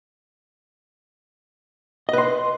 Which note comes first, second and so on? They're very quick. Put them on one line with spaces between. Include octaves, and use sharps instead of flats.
D#5 B4 C6